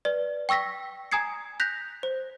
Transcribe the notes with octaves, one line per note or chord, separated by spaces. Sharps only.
B4 D5
G5 C#6 E6 A#6 B6
G#5 A#5 D#6 G#6 C7 C#7
F#6 G6 A#6 B6 F7
C5